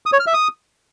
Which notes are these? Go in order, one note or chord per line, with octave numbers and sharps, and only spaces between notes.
D#6
C#5
F6
E5
D#6